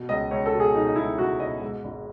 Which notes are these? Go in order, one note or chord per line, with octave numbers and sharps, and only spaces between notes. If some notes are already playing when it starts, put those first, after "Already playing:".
Already playing: B2
C#2 D#5
C#2 C#5
A4
B2
G#4
B2 D#4
D#4
C#2 E4
C#2 F#4
B2 D#5
G#2
G#1